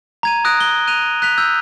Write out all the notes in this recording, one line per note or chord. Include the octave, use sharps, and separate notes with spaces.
A#5 G#6 D#7
A#5 D#6 F#6 A#6 D7
G7
F#6 D#7 F7
F#6 B6 F7
E6 G6